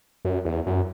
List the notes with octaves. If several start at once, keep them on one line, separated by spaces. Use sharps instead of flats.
F#2
E2
F#2